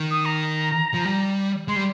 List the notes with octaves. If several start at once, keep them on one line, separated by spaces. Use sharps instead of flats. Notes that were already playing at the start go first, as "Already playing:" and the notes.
Already playing: D#3
D#6
A#5
F3
G3
G#3 C6
G3